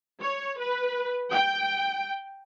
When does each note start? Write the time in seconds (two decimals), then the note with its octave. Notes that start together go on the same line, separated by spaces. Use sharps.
0.22 C#5
0.59 B4
1.33 G5